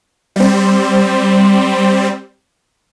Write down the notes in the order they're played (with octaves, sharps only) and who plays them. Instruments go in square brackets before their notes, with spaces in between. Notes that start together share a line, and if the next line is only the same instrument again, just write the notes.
[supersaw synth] G3 C4